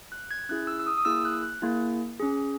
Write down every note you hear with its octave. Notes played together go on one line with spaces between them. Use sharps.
F#6
G#6
C#4 E4 G#4 F#6
E6
E6
D#6
D#6
A#3 E4 G#4 E6
F#6
F#6
A#3 E4 G#4
C#4 G#4